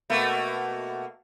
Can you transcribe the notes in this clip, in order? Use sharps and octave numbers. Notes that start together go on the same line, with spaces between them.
B2 A3 A#3